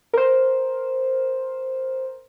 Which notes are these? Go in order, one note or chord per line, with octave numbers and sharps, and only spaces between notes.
A#4 C5